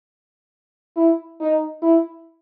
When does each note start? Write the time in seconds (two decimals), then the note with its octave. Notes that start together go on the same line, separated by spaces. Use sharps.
0.96 E4
1.40 D#4
1.82 E4